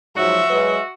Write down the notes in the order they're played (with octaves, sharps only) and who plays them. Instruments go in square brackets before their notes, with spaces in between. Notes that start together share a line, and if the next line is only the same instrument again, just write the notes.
[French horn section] G#2 F3 F#3 [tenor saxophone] F#4 [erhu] E5
[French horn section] F#3 G#3 B4